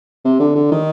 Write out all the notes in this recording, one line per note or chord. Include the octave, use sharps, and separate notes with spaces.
C3
D3
D3
D#3